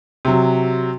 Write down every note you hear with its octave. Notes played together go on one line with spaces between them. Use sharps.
C3 F#3